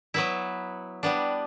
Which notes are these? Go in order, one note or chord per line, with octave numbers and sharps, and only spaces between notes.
F#3 B3 E4
G3 B3 D4